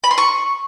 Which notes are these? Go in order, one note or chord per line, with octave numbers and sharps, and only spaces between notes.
B5
C6
C#6